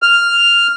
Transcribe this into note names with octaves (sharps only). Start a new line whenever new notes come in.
F6